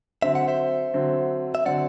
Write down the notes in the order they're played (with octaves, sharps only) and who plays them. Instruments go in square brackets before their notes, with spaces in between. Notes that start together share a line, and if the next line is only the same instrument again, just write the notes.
[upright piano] D3 F#3 C4 [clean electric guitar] E5
[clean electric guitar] F#5
C5 E5
[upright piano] D3 F#3 C4
[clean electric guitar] E5
[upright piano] D3 F#3 C4 [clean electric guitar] D5 F#5